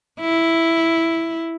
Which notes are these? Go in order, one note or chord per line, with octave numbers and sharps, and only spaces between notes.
E4